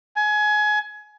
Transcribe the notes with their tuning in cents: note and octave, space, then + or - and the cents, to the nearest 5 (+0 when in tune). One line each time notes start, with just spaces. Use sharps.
G#5 +25